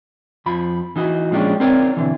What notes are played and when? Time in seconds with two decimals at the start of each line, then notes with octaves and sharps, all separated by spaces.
0.46 F2 F3 B5
0.96 E3 D#4 F#4
1.31 A#2 F3 G#3 C#4 D4 G4
1.60 C4 D#4 A#4 C#5 D5
1.97 B2 D3 E3